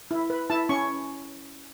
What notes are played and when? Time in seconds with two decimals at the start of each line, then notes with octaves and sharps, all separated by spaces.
0.11 E4
0.30 B4
0.50 E4 A5
0.69 C#4 C#6